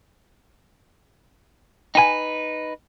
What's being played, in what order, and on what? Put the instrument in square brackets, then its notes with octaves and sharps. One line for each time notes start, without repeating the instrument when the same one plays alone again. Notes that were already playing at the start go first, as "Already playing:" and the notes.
[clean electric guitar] D#4 B4 [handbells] G5 G#5